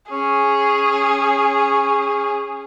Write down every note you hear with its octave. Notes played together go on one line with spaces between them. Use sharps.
C#4 G#4